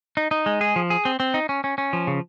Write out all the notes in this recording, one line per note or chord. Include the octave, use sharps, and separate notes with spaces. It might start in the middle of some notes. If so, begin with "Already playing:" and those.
D#4
D#4
G#3
G#4
F3
G#4
C4
C4
D#4
C#4
C#4
C#4
F3
C#3